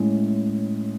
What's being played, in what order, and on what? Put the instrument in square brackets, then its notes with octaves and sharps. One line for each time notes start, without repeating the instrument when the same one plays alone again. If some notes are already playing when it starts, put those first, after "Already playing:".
Already playing: [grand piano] A2 G#3 C#4 E4